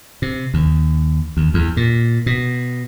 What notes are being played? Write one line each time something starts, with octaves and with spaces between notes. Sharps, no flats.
C3
D#2
D#2
E2
A#2
B2